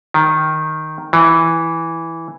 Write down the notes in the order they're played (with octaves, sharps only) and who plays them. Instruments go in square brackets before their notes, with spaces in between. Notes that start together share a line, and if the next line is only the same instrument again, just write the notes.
[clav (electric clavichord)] D#3
E3